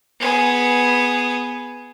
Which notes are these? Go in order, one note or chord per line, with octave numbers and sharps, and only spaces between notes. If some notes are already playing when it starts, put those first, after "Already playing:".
B3 G#4